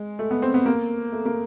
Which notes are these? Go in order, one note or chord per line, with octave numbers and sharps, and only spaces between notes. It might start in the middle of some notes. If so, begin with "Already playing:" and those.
Already playing: G#3
A3
B3
C4
B3
A#3
A3
A#3